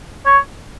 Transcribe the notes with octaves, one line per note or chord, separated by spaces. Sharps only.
C#5